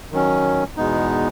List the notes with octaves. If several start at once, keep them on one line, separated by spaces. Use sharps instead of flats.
D#3 F#3 C#4
E2 B2 G#3 B3 D#4